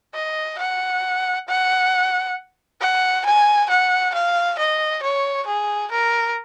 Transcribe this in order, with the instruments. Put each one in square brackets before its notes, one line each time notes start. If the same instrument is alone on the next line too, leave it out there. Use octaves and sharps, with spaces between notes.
[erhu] D#5
F#5
F#5
F#5
G#5
F#5
F5
D#5
C#5
G#4
A#4